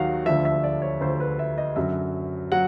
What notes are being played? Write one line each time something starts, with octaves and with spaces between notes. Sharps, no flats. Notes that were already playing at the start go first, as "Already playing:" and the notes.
Already playing: D#2 D#3 F#3 F5 F#5
D2 D3 F3 E5
E5
D5
C#5
D2 D3 F3 C5
B4
E5
D#5
F#2 D3 F#3 E5
F#3 F#5